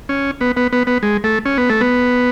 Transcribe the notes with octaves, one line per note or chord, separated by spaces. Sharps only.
C#4
B3
B3
B3
B3
G#3
A3
C#4
B3
A3
B3